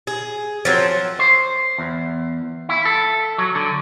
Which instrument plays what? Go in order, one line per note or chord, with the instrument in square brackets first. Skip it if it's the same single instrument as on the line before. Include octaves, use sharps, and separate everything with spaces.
[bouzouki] G#4
F3 F#3 C4
[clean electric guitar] C5
E2
E4
A4
F#3
D3